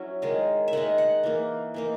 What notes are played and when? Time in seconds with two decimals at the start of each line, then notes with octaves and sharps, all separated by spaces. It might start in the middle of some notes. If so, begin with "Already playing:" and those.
Already playing: F#3 C#4 E4
0.22 D#3 G#3 D#4
0.68 E5
0.73 D#3 G#3 D#4 F#5
0.98 F#5
1.23 E3 A#3 D#4
1.74 E3 A#3 D#4